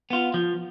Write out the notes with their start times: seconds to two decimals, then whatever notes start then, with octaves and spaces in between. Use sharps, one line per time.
0.10 B3 F4
0.34 F3